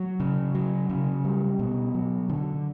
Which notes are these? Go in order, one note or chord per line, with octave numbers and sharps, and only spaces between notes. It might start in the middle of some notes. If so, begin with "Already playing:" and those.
Already playing: F#3
C#3
F#3
C#3
G3
B2
F#3
D3